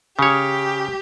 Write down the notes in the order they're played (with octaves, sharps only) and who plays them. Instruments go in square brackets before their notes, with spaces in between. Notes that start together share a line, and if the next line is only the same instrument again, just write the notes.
[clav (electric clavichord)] C#3 C#5 [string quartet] G4